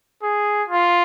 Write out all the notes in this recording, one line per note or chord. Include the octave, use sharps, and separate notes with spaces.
G#4
F4